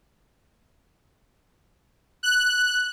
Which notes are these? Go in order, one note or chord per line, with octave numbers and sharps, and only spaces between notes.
F#6